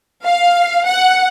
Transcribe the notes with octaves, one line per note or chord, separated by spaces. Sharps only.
F5
F#5